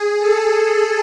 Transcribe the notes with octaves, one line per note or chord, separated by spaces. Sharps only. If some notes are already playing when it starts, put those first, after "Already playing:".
Already playing: G#4
A4